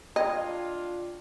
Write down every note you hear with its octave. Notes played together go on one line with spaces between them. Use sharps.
D4 F4 D#5 G5 B5 G#6